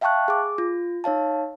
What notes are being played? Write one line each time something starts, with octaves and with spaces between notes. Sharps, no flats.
E5 F5 G5 A5 C#6 F#6
G#4 D6
F4
D#4 C#5 F5 A5